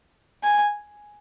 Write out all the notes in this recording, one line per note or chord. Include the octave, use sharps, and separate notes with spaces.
G#5